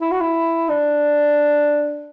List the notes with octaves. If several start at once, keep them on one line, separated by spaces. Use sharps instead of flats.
E4
F#4
E4
D4